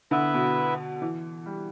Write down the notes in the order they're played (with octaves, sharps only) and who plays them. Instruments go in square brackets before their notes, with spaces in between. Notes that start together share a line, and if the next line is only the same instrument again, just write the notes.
[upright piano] D3 [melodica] B3 E4 B4 E5
[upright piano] B2
E3
G3